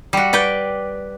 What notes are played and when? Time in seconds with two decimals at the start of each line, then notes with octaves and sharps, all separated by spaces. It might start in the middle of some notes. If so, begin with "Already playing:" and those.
0.13 G3 F#4
0.33 B4 D5 G5